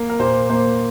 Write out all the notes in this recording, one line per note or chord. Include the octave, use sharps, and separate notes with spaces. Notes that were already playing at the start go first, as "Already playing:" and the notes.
Already playing: A#3
A#4
A#2 C5
A#3 C5